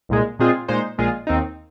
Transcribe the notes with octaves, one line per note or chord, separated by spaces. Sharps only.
C2 A#2 G#3
A#2 G#3 C4 F4 G#4
A#2 G#3 D#4 C5
A#1 A#2 G#3 F4 G#4
D#2 D#3 C4 D#4